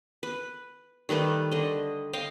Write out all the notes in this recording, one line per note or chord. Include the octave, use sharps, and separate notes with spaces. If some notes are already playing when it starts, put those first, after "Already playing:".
B4
D#3 G3 A3 B4
D3 D#5
D#5 F5 G5